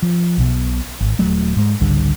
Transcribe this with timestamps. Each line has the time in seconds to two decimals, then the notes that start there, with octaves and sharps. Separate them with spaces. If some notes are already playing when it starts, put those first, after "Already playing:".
0.02 F3
0.38 B1 B2
1.01 G#1
1.19 D#1 F#3 A3
1.56 G#2 G#3
1.80 G#1 C#2 D3 G3